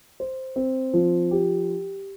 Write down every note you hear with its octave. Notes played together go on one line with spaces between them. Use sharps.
C5
C4
F3
G4